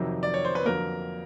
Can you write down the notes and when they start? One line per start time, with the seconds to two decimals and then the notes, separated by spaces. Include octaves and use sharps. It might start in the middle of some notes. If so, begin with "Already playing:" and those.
Already playing: F2 C3 D#3 F#3
0.23 D5
0.34 C#5
0.45 C5
0.55 B4
0.65 F2 D3 F#3 A#3 A#4